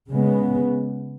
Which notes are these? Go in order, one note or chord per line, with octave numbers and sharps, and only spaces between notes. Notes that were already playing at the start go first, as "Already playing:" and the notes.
C#3 G#3 B3